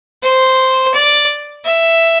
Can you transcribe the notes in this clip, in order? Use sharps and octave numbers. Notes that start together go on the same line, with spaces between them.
C5
D5
E5